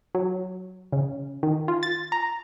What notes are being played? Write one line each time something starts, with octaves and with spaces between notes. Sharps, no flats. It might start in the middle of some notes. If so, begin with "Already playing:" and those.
F#3
C#3
D#3
F4
A6
A#5